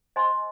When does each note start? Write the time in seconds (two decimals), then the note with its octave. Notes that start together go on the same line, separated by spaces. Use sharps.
0.16 C5 D#5 G#5 C6